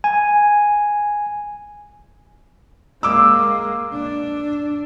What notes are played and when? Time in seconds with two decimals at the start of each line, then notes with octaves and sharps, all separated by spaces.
0.04 G#5
3.03 G#3 A#3 D6 E6
3.93 D4